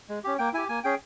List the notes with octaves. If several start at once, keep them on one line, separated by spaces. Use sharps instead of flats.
G#3
C#4 G4
A#3 G5
E4 G4 G#5
A#3 G#5
C#4 G#4 G5